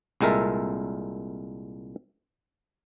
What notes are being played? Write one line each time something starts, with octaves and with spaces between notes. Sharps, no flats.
C2 A#2 G#3 A4 A#4 E5